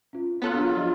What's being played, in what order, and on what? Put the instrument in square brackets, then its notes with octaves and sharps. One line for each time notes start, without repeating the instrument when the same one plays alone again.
[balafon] C#4 F4
[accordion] F#3 F4 [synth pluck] B3 A4 F#6
[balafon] D4 G#4
F3 D#5 E5